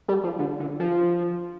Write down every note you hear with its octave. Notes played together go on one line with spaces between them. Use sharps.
G3
F3
D3
D3
F3